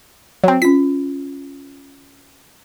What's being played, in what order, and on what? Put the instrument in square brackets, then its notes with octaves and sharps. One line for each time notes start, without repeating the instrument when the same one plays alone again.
[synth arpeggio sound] F#3 C4
[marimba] C#4 F4 [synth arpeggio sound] B6